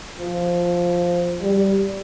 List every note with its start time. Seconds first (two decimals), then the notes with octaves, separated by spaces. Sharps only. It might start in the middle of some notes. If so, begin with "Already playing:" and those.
0.19 F3
1.41 G3